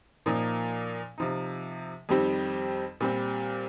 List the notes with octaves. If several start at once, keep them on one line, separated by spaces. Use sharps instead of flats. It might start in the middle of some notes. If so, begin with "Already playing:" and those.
A#2 F3 A#3 D#4
C3 F3 D#4
F2 D#3 G3 C4 G4
A#2 G3 C4